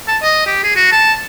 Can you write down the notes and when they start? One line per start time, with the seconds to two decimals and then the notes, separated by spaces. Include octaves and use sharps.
0.08 A5
0.23 D#5
0.47 G4
0.64 G#4
0.76 F#4
0.92 A5